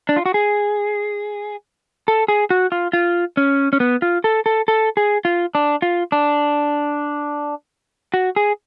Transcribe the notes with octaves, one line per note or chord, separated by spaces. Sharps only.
D4
F4
F#4
G#4
A4
G#4
F#4
F4
F4
C#4
C#4
B3
F4
A4
A4
A4
G#4
F4
D4
F4
D4
F#4
G#4